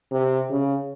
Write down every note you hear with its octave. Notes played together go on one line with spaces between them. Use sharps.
C3
C#3